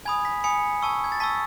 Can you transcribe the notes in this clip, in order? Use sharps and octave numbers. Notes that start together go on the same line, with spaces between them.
G#5 B5 D#6 G#6
B6
G#5 B5 D#6 C#7
A5 C#6 E6
G#6
A6
A5 C#6 E6 B6